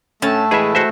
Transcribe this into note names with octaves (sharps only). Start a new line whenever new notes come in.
A2 A3 C#4 A5
E3 G#3 G#4 B4 E5
F#4 C5 E5